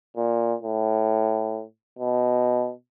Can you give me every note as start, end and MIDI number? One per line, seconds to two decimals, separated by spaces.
0.17 0.54 46
0.63 1.63 45
1.99 2.71 47